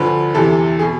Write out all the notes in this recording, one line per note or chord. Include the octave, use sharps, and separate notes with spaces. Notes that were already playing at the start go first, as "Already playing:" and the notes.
Already playing: D2 D3 F3 B4
E2 C3 E3 A4
B2 G#4